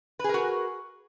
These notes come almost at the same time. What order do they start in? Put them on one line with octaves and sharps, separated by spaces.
B4 G#4 A#4 F#4